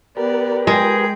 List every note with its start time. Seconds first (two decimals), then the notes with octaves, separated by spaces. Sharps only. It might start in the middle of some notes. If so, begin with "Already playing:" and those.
0.17 B3 G4 A#4 B4 D5
0.67 G#3 G#4 G5